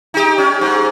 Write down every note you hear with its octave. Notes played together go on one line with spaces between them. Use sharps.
D#4 G4
C#4
G#2